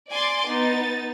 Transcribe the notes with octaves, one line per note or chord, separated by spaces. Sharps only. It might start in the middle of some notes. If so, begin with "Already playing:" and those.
D5 G#5 C6 D6 A6
B3 D#4 A6